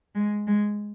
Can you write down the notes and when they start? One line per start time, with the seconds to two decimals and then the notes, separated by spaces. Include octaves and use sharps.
0.15 G#3
0.47 G#3